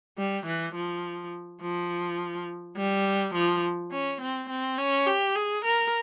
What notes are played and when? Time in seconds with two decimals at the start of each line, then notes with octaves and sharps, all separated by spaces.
0.18 G3
0.46 E3
0.75 F3
1.61 F3
2.77 G3
3.35 F3
3.91 C#4
4.21 C4
4.50 C4
4.78 C#4
5.07 G4
5.36 G#4
5.65 A#4